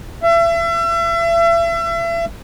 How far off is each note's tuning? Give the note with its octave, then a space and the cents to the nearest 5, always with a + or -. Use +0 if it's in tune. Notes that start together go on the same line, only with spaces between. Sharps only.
E5 +35